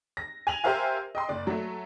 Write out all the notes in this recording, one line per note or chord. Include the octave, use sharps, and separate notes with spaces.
A#6
G#5 F7 F#7
G4 A#4 C5 E5 F5 G#5
D#5 G5 C6
F#1 D5
F#3 A3